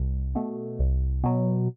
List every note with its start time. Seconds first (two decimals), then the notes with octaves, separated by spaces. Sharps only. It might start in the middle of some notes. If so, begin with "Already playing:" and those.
Already playing: C2
0.35 B2 A3
0.79 C2
1.24 B2 F#3